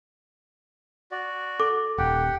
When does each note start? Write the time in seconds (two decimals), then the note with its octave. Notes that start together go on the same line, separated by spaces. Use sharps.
1.11 F#4 D5
1.60 A4 D6
1.98 D#1 G4 F#5 G5